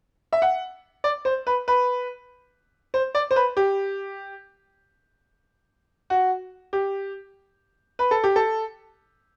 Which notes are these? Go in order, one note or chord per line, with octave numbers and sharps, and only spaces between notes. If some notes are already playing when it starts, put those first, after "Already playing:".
E5
F#5
D5
C5
B4
B4
C5
D5
C5
B4
G4
F#4
G4
B4
A4
G4
A4